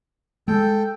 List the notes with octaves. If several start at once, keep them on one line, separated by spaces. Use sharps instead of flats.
G#3 A4 G5